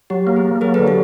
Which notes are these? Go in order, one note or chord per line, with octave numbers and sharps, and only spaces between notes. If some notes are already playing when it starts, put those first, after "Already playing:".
F#3 G4
A#3
G#4
A#3
F#3 G#4 A#4
A4 B4
D3
G4 A4